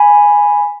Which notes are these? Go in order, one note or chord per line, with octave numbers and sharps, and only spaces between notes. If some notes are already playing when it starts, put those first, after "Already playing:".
Already playing: G#5 B5